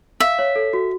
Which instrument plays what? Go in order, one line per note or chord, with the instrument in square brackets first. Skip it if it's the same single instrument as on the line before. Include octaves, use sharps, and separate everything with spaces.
[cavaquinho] E5 [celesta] F5
[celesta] C#5
A4
F#4